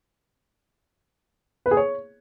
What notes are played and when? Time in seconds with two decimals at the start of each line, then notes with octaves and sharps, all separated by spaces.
1.66 B4
1.71 G#4
1.77 C#5